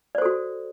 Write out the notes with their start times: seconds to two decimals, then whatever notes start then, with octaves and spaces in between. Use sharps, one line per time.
0.15 D5
0.18 C5
0.22 A4
0.25 F#4